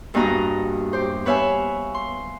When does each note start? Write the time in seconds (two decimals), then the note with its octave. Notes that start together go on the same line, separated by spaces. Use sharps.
0.14 E2 G2 A#3 F#4 D#5 A#5
0.93 G4 C5
1.25 B3 B4 C#5 E5 F5 G#5
1.95 C6